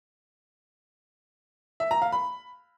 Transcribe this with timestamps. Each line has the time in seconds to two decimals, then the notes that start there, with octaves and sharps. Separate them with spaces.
1.80 E5
1.91 A#5
2.02 F5
2.12 B5